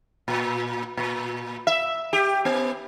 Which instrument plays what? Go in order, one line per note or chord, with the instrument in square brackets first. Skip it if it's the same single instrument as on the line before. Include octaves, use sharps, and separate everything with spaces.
[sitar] A#2
A#2
E5
G4
B3